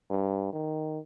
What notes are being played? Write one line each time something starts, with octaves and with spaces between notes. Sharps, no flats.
G2
D#3